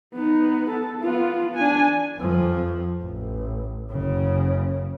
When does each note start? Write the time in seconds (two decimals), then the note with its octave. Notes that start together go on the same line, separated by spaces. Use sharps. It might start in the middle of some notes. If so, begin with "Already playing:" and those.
0.14 B3 D#4
0.70 A4
1.01 B3 F4
1.55 D4 G#5
2.18 F2 F3
3.02 A1
3.91 F#1 C#3